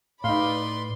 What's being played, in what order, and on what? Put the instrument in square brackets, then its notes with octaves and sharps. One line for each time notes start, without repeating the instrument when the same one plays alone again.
[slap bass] A2 [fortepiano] D#4 F5 [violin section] B4 D5 B5 [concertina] C6